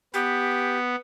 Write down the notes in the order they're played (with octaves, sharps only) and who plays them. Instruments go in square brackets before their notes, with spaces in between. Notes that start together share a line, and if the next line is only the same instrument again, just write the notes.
[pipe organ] B3 [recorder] G4